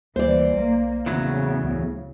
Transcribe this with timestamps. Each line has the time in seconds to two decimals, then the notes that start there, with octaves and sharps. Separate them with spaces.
0.16 D2 E3 G3 A#3 C5 D5
0.53 B1 A#3
1.06 E2 A2 C#3 E3 F#3
1.63 C#2